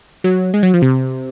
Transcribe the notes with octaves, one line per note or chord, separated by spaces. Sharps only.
F#3
G#3
F#3
F3
C3